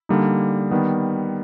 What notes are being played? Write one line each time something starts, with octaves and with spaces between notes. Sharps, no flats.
D3 G3 A#3 D#4
D#3 G3 B3